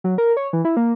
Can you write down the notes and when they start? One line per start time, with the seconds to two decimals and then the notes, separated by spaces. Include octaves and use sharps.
0.04 F#3
0.18 A#4
0.37 C#5
0.53 E3
0.65 E4
0.77 A#3